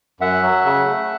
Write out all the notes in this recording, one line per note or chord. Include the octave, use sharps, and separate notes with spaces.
F#2 E5 F#5
F#3
C#3
A3